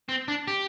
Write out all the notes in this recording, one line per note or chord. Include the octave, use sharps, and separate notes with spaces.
C4
D4
G4